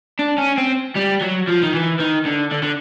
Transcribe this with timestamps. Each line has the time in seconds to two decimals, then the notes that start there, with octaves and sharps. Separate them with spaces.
0.19 D4
0.38 C#4
0.58 C4
0.96 G3
1.22 F#3
1.49 F3
1.63 D#3
1.75 E3
2.00 D#3
2.26 D3
2.52 D3
2.63 D3